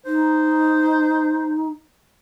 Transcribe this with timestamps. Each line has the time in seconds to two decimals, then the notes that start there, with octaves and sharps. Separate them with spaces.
0.06 D#4 C5